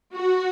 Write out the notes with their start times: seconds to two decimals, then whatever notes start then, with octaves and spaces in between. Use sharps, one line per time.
0.16 F#4